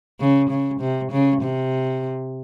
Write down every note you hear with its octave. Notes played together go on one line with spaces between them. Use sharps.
C#3
C#3
C3
C#3
C3